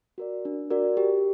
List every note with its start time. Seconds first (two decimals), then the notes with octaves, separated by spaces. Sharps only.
0.18 F#4 A#4 D5
0.45 D4
0.70 F#4 A#4 D5
0.97 G4